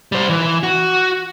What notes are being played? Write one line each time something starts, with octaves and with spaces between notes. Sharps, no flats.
G3 C5
E3
F#4